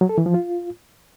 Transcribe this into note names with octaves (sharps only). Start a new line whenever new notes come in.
F#3
A4
E3
F3
F4